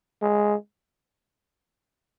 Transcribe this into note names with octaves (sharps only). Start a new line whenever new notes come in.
G#3